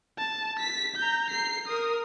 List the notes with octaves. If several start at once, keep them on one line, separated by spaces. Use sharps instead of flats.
A5
B6
A#5 G6
C7
A#4 D#6